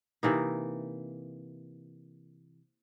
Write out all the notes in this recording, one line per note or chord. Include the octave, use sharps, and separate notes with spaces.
C3 E3 A#3 D#4